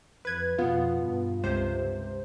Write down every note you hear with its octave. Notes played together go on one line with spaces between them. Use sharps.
F2 B4 G#6
F2 B2 B3 F4
G2
C#2 C3 C5